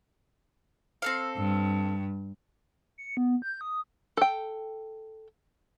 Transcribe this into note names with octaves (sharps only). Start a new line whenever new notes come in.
C4 A4 F5
G2
C#7
B3
G6
D#6
A4 G5